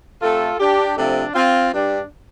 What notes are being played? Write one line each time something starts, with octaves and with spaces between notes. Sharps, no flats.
C3 A3 F4 A4
D4 G4
C3 F3 A3 D4
C4 F4
G2 G3 D4